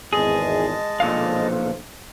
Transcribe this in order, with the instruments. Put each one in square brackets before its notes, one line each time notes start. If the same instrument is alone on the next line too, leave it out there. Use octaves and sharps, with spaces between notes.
[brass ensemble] G#1 E2 [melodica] G#3 D#5 A5 [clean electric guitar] G#4
[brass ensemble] B1 F3 [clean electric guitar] A#2 D3 F5